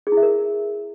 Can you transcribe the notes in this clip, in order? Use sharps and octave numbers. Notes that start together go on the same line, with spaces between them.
G#4
E4
E5
A#4